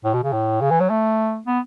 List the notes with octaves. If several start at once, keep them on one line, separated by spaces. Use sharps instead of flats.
A2
B2
C#3
A2
C#3
E3
F#3
A3
B3